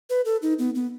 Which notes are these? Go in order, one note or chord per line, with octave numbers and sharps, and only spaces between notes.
B4
A4
D#4
B3
B3